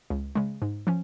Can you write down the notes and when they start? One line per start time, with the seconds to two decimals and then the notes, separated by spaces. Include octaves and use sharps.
0.10 C#2
0.35 C#3 G#3
0.62 G#2
0.87 F3 C#4